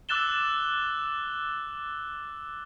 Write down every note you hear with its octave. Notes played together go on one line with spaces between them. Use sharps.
D6 E6 F#6 A6 E7 G7